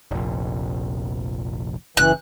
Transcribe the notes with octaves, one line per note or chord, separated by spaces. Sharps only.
F1 A#1
F#1 A#2 C#3 E3 F#6